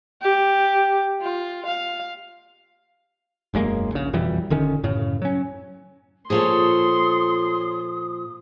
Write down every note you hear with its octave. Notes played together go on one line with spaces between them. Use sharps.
G4
F4
F5
E1 F#2 G#3 A#3
A#1 C#3
F2 B2 E3 G3
D#1 D3 D#3 C#4
F#2 A2 C#3
F#3 C#4
A#2 F3 F4 G#4 A4 C#5 C6 D#6